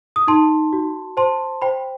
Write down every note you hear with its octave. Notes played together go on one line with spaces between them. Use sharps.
D#6
D#4 A5 C6
F#4
C5 A5 C6
C5 G5 B5